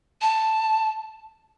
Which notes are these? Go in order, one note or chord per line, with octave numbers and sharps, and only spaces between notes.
A5